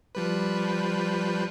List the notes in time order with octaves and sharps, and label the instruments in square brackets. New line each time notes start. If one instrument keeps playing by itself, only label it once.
[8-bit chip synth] F3 G3 B4